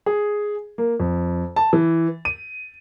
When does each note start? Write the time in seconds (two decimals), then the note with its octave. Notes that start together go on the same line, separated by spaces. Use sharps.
0.06 G#4
0.78 A#3
1.00 F2
1.56 A5
1.73 E3
2.25 D#7